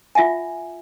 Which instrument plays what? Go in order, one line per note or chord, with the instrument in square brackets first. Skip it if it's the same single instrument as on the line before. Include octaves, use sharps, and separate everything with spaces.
[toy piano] F4 E5 F#5 G#5